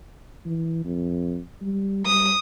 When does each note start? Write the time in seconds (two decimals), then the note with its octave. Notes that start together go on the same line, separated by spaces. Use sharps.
0.45 E3
0.85 F2
1.61 G3
2.06 G3 D#6